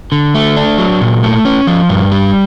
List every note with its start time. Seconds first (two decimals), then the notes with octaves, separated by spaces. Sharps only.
0.12 D3
0.34 A3
0.56 D4
0.78 F#3
1.01 A#2
1.24 A3
1.45 C#4
1.67 F3
1.89 G2
2.12 G3